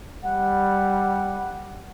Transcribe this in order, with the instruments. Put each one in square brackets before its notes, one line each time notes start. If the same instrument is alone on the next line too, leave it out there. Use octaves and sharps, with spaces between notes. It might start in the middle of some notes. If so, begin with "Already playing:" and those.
[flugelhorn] G3 [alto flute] F#5